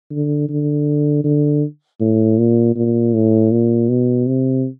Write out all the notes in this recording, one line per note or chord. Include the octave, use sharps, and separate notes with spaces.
D3
D3
D3
A2
A#2
A#2
A2
A#2
B2
C3